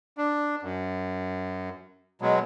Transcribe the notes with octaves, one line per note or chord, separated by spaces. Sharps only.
D4
F#2
B2 F#3 G#3